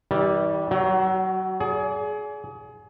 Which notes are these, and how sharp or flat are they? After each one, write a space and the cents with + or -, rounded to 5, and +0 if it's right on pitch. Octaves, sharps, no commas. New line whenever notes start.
E3 -45 G3 -10
F#3 +25 F#4 +0 G5 -10
G#4 +25 D5 -35